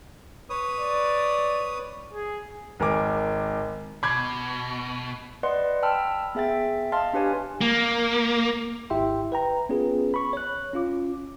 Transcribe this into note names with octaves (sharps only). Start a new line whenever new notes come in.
B4 C#5 D#6
D5
G#4
G#1 A#4 G#5 D6
B2 B5 D6 G#6
B4 D5 D#5 F#5 C6
G5 A5 B5 E6 F6
B3 G#4 E5 G5 A6
D#5 F5 A5 C6 F6 A6
D4 G4 B4 C#5 G#5
A#3
G#1 E4 G4 E5 G5 C6
B4 G5 A#5
B3 C#4 F4 G#4 B4
B5 C#6
C#5 F#6
C#4 F4 D6